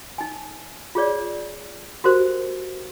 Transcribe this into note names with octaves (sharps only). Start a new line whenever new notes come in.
D#4 G#5
F4 G#4 C#5 D5
F#4 G4 A#4 C5